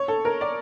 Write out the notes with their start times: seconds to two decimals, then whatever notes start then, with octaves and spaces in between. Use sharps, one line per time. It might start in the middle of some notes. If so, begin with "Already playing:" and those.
Already playing: C#5
0.08 A4
0.25 A#4
0.41 D5